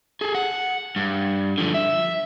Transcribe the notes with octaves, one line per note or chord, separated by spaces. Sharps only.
G#4 A4
F#5
G2
D3 F3
E5